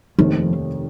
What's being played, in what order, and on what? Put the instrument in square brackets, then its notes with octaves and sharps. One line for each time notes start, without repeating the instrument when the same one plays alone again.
[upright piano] F1 D#2 D#3 [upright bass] F3